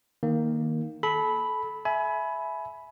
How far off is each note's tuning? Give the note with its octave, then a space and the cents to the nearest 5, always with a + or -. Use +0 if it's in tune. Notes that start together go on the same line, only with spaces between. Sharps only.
D#3 +0 A#3 +0
A4 -30 B5 +0
E5 +0 G#5 +25 B5 +0